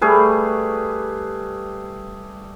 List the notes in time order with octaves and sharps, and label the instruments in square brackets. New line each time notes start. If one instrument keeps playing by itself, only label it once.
[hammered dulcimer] G3 A3 G#4 B4